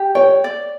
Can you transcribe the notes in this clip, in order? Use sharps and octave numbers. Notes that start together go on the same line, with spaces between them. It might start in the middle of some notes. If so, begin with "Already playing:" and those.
Already playing: G4
C#5 G5
D5